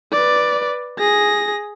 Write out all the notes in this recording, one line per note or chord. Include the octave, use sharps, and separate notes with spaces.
B4 D5
G#4 A#6